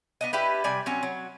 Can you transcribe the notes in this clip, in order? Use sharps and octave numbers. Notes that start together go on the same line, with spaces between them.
B3 D4 D#5
D4 E4 G4 B4
C3 G3 D5 G#5
F#3 C4 C#4
F#3